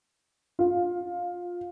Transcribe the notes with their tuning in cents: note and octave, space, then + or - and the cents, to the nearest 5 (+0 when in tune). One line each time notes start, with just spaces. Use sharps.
F4 +20